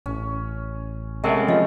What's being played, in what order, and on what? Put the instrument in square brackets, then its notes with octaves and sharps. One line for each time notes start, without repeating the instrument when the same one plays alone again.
[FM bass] A1 [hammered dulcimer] C#4
[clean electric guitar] C3 G#3 C#4 [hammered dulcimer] A3 B3 [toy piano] A#4 E5 G5
[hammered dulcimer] C#3 [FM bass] F3 [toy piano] D#5 F5